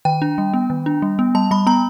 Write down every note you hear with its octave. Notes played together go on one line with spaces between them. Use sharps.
D#3 G5
D4
G3
B3
D#3
D4
G3
B3
G3 A5
G3 B5
B3 A#5